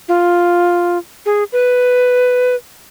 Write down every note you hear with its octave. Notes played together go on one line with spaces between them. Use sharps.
F4
G#4
B4